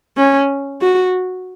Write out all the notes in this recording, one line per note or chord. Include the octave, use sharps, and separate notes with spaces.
C#4
F#4